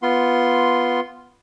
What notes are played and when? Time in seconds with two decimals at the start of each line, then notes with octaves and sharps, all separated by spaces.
0.02 B3 F4 C6